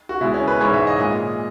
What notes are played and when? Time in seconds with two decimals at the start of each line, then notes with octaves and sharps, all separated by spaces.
0.09 F#4
0.21 B2 G#3 E4
0.34 C#4
0.47 B4
0.60 G#2 E3 G#3 C#5
0.74 E5
0.87 D#5
0.99 A#2 G#3 D#5